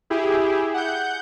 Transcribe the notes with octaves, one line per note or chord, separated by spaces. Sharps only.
E4 G4 G#4
F#5 G6